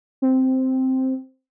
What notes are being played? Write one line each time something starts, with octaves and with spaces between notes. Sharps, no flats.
C4